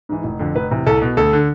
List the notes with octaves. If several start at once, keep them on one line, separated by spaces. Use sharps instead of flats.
G#2 E3
F1
F2 D3
F1 B4
E2 C3
C2 A4
B2
D2 A4
D3